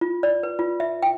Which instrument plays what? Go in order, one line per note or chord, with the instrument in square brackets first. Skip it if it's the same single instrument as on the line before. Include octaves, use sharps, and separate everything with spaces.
[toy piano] F4
D5
B4
F4
E5
G5